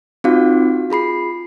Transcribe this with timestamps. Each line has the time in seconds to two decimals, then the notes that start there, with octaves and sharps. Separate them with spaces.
0.24 C4 D#4 F4 F#4 F5 D6
0.90 F4 G#4 B5 C7